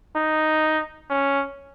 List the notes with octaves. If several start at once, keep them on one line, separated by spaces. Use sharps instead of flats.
D#4
C#4